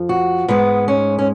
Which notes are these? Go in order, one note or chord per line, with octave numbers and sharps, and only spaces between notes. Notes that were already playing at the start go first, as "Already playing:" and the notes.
Already playing: F2 F3
F#4
G#2 G#3 B3
C#4
C#4